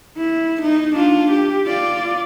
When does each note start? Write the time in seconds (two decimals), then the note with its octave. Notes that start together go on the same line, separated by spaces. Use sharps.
0.17 E4
0.62 D#4
0.95 D4 F4
1.31 G4
1.67 F4 D5